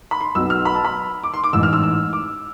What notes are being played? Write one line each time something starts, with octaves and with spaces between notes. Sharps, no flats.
B5
C6
B1 B2 B3 E6
F6
B5
A5
B5
D6
C6
D6
A1 G#2 E3 E6
F6
E6
E6
D6